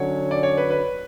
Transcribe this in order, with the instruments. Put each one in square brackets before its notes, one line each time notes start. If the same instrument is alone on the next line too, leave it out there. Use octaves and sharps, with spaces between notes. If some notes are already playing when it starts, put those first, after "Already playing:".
Already playing: [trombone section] D3 F#3 C#4 [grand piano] C#5
[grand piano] D5
C#5
B4
B4